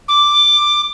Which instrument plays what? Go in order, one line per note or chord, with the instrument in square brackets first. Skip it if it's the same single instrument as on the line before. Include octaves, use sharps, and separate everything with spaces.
[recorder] D6